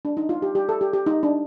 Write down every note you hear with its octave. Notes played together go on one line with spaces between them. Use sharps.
D4
D#4
F4
G4
G4
A4
G4
G4
D#4
D4